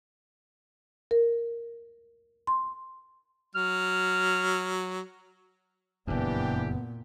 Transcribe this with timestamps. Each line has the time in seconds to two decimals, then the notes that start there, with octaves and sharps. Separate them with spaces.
1.11 A#4
2.47 C6
3.55 F#3 F6
6.07 F#1 F2 A#2 E3 B3 D4 G4